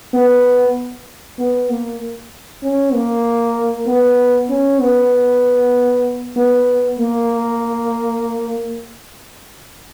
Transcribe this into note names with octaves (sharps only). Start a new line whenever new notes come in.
B3
B3
A#3
C#4
A#3
B3
C#4
B3
B3
A#3